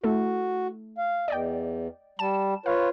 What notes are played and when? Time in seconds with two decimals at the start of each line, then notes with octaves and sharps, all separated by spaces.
0.04 A3 E4 F#4 A4
0.98 F5
1.28 E2 D5 D#5 G5
2.19 G3 A5 E7
2.66 F4 B4 C#5 F5